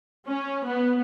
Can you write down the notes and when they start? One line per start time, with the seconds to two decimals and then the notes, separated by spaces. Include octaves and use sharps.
0.28 C#4
0.67 B3